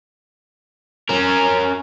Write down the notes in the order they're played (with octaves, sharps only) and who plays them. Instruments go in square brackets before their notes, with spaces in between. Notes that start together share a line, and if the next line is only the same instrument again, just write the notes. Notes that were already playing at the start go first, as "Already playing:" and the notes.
[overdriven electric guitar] C#4 A#4